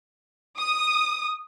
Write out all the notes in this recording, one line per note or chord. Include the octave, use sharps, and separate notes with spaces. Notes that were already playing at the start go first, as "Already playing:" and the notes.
D#6